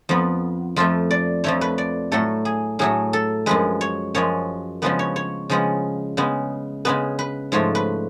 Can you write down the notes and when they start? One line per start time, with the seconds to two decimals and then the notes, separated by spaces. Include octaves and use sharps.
0.09 F2 F3 B3
0.76 F2 F3 A3 F4
1.11 D5
1.44 F2 F3 A3 C#5
1.61 B4
1.78 D5
2.12 A2 F#3 A3 A4
2.45 G#4
2.79 A2 F#3 A3 G#4
3.13 A4
3.46 F#2 F3 G#3 B4
3.81 C#5
4.14 F#2 F3 G#3 C#5
4.82 C#3 F3 G#3 B3 B4
4.99 C#5
5.16 C#5
5.50 C#3 F3 G#3 B3
6.17 C#3 G#3 B3
6.85 C#3 G#3 B3 B4
7.19 B4
7.52 G#2 F3 A3 C#5
7.75 B4